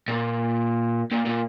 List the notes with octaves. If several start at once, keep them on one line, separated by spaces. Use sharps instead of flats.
A#2
A#2
A#2